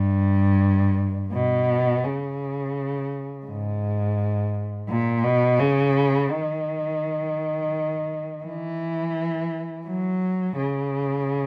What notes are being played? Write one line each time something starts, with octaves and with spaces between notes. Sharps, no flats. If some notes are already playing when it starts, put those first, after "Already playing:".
Already playing: G2
B2
C#3
G#2
A#2
B2
C#3
D#3
E3
F#3
C#3